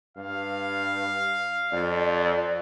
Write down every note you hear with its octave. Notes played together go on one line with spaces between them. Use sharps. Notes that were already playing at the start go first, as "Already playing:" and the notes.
G2 F5
F2 D5